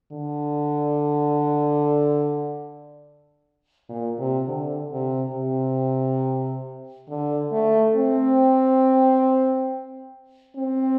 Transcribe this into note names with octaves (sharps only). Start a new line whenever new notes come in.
D3
A#2
C3
D3
C3
C3
D3
A3
C4
C4